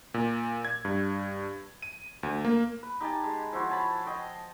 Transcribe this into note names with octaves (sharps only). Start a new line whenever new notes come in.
A#2
G#6
G2
D#7
D2
A#3
B4
D#4 G4 G#5 A5
G#3
F3 E4 F#4 C5
C#5 G#5 A5 B5
D#5 G5 C6